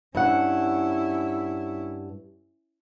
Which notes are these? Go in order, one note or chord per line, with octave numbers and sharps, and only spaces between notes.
G2 C#4 E4 F#5